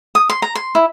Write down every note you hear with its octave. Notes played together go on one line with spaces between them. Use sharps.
D#6
C6
A#5
C6
E4